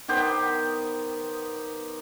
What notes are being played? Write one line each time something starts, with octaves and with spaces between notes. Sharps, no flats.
D#3 B3 G4 C5